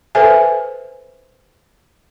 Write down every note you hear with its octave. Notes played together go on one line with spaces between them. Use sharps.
A4 B4 C5 E5 G#5